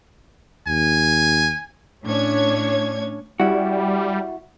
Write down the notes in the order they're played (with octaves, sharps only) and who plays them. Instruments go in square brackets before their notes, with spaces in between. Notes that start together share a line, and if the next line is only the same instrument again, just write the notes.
[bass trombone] D#2 [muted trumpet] G#5
[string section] A2 C#4 D4 C#5 G#6
[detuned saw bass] G3 [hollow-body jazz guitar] C#4 E4 F#4